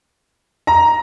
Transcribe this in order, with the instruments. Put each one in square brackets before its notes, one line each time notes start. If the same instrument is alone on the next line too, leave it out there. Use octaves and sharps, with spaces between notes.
[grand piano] A#5